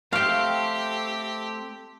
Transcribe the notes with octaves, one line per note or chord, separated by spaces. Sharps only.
A3 C4 G4 F5 G5